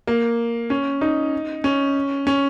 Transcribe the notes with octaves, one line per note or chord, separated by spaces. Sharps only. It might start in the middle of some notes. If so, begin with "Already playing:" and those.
A#3
C#4
D#4
C#4
C#4